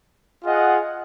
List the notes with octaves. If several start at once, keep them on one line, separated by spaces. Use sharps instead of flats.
F4 G#4 D#5 F#5